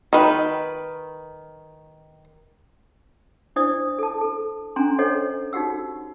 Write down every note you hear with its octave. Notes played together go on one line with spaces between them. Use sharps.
D#3 B4
D4 E4 C5 D5 D#6
A4 A5
A4
C#4 D4 G#5 A#5 C6
A4 C5 C#5 D#5 F#5
D#4 F#4 G4 F#5 E6